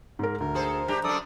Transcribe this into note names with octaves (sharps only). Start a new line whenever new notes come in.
G#2 A#4
D2 A#4
G#4 A4 C5
G3 D4 G4 A#5
F#2 D4 A4 D5 D#6